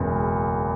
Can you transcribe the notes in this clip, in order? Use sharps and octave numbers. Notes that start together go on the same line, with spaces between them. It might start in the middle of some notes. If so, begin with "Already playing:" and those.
Already playing: F#1 E2 B2 G#3